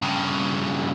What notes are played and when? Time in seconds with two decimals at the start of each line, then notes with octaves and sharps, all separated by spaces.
0.02 G2 C#3